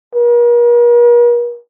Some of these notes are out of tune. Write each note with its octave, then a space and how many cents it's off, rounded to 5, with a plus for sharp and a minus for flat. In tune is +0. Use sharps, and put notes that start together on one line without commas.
A#4 +45